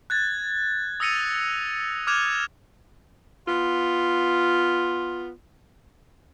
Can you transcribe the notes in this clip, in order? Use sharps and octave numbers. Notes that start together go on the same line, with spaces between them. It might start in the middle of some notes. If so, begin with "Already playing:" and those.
F#6 G#6 A6
D#6 E6 A#6 C#7 D#7 F7
D6 F6 F#6 G#6 E7 F7
B3 F4